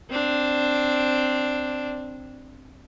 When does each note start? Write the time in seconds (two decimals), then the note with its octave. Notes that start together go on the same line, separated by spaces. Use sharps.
0.10 C4 D4